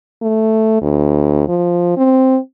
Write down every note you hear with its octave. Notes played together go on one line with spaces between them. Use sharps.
A3
D2
F3
C4